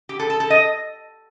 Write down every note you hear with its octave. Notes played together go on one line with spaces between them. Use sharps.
G4
A4
A4
A4
D#5